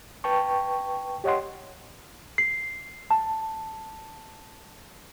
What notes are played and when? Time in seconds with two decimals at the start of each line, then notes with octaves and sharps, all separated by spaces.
0.24 B4 G5 A5 C#6
1.24 G4 C#5 D#5 F#5 C6
2.38 C7
3.11 A5